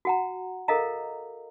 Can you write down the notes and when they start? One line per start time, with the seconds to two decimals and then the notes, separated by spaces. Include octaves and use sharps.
0.05 F#4 F#5 A#5
0.68 A4 A#4 D#5 F5 A#5